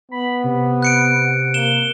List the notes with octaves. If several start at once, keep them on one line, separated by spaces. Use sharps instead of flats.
B3 B5
C3
F#6 C#7 D7
A#3 E7 G7